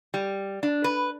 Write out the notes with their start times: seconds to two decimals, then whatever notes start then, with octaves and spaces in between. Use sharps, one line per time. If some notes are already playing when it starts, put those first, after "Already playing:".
0.14 G3
0.63 D4
0.84 B4